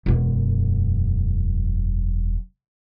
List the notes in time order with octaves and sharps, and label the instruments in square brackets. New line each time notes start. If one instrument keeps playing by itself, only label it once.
[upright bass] E1 F#2